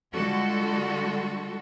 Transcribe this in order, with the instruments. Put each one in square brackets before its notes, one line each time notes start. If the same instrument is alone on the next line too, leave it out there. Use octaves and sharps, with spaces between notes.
[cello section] D3 G3 G#3 F4 F#4 A4